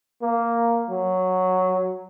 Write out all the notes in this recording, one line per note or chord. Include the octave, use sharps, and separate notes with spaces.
A#3
F#3